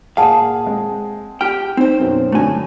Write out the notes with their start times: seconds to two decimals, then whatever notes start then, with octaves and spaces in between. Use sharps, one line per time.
0.17 A#2 G#4 F5 F#5 A5
0.66 G#3 C4
1.41 G4 G5 F6
1.77 C4 D#4 C5
2.00 F#2 B2 F#3
2.32 G2 D3 F#3 A3 G#5